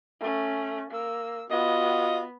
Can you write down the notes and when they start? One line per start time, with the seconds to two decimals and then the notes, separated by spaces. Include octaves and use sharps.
0.20 A3 C#4
0.91 A#3 E6
1.50 B3 F4 F#4 D#5